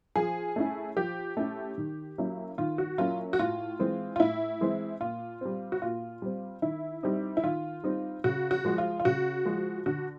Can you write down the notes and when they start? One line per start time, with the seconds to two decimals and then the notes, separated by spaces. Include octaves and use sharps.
0.16 F3 G#4
0.56 A3 C#4 E4
0.96 F3 G4
1.37 A3 C#4 E4
1.78 D#3
2.18 F#3 A#3 C#4 E4
2.58 D#3 F4
2.78 F#4
2.98 F#3 A#3 C#4 E4 F4
3.33 F#4
3.39 A2 F4
3.79 E3 G#3 C4
4.16 F4
4.20 A2 E4
4.61 E3 G#3 C4
5.00 A#2 F4
5.41 G3 C4
5.72 F#4
5.82 A#2 F4
6.22 G3 C4
6.62 D#3 E4
7.03 G3 C4 D#4
7.37 E4
7.44 D#3 F4
7.84 G3 C4 D#4
8.24 C#3 F#4
8.51 F#4
8.65 F3 G#3
8.78 F4
9.00 F4
9.05 C#3 F#4
9.45 F3 G#3
9.86 D3 F#4